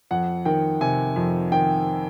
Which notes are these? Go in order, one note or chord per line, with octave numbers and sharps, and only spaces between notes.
F2 F#5
D#3 G5
C3 G#5
F2
D#3 G5